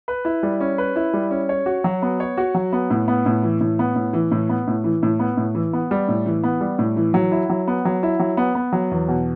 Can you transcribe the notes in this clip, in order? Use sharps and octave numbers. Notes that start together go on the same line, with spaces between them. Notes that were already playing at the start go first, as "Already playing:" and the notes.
B4
E4
G3
C#4
B4
E4
G3
C#4
C#5
F#4
F#3
B3
C#5
F#4
F#3
B3
A2
B3
A2
E3
A2
B3
A2
E3
A2
B3
A2
E3
A2
B3
A2
E3
B3
G3
A2
E3
B3
G3
A2
E3
F#3
E4
F#3
B3
F#3
E4
F#3
B3
B3
F#3
E2
B2